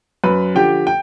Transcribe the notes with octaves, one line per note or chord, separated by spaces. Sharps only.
F#2 B4 B5
D3 F3 G4 G5
G5